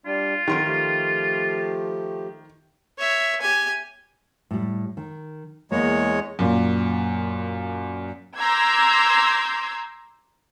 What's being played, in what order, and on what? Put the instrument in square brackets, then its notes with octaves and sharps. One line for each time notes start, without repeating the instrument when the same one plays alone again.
[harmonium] G3 D4 [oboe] F4
[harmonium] F2 F#3 [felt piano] D#3 C6 D7
[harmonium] F3 A3 G4
[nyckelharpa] C#5 E5
G4 G#5
[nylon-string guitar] A2 G3
D#3
[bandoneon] E2 G#3 C#5 [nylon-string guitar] A#3
[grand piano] F#2 A#2
[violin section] A#5 C6 D6 E6 G6 G#6